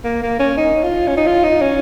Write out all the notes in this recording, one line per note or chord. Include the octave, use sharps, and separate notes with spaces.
A#3
A#3
C#4
D#4
F4
C#4
D#4
F4
D#4
C#4